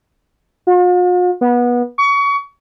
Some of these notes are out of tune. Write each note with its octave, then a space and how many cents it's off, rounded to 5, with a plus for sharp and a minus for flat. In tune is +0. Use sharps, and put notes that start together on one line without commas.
F4 +45
B3 -25
C#6 +30